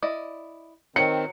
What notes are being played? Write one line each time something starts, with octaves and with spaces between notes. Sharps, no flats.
E4 D5 D#5
D#3 F#3 C4 C#7